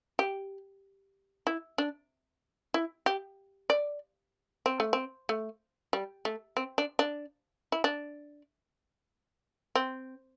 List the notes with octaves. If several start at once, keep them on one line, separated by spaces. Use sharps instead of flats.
G4
E4
D4
E4
G4
D5
C4
A3
C4
A3
G3
A3
C4
D4
D4
E4
D4
C4